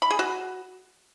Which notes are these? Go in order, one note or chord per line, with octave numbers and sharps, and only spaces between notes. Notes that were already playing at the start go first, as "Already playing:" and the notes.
B5
G#4
F#4